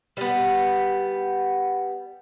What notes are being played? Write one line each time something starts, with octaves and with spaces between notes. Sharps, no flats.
G3 B3